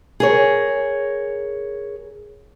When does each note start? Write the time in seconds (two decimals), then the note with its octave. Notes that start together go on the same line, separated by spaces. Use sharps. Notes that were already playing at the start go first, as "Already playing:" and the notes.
0.20 G#4 A#4 C#5